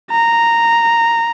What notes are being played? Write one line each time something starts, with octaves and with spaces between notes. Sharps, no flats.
A#5